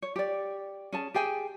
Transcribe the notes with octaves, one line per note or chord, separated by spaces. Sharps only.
C#5
G4 D5
C#4 G#4 A5
G4 G#4 G5 G#5